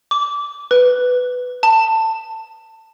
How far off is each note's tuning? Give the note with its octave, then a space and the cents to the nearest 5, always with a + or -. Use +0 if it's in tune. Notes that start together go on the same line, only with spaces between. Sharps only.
D6 -20
B4 +10
A5 +15